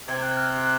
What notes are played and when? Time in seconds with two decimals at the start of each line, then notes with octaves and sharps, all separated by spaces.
0.09 C3 G#6
0.22 F#6
0.37 F6
0.50 F#6